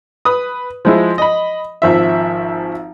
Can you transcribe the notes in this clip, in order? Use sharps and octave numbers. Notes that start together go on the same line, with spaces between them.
B4 D#6
F3 G#3 E4
D#5 B5
G#1 F3 E5